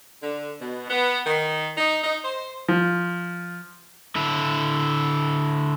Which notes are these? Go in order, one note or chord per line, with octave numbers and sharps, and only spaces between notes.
D3
B2
B3
D#3
D#4
D#4
C5
F3
D3 E4